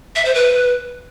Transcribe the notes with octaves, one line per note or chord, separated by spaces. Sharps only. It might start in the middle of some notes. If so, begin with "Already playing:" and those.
E5
C5
B4